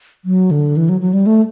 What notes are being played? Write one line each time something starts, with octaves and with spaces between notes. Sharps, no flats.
F#3
D3
E3
F#3
F#3
G3
A3